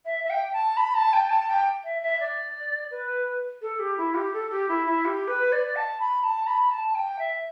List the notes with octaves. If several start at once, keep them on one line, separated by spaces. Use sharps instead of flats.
E5
E5
G5
A5
B5
A5
G5
A5
G5
E5
E5
D5
B4
A4
G4
E4
G4
A4
G4
E4
E4
G4
B4
D5
A5
B5
A5
B5
A5
G5
E5